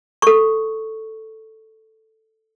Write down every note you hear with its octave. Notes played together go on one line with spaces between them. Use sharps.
A4 C#6